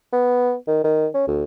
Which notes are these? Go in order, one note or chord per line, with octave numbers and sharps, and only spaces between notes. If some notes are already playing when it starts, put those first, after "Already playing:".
B3
D#3
D#3
C#4
D2